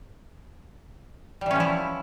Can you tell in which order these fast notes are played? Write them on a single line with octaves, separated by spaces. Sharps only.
G3 E3 C#4 F3 E4